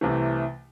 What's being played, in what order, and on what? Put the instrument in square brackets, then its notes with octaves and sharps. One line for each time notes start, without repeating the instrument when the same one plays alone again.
[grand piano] C2 C3 E3 A3